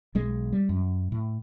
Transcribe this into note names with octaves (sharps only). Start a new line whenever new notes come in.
B1 G#3
G3
F#2
A2